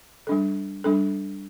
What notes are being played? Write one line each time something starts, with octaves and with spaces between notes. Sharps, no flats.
G3 D4 A4
G3 D4 A4